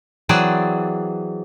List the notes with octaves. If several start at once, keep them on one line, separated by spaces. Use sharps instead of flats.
E3 F#3 C4 G#4 D5